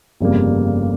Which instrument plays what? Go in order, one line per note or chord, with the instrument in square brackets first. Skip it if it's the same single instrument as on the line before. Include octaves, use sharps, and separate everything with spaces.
[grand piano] G1 F2 C#3 G3 A#3